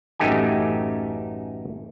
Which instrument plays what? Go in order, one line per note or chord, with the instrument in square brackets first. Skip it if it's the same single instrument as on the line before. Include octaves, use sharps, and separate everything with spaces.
[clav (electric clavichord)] A1 F#2 A3 D#4 G4 G#5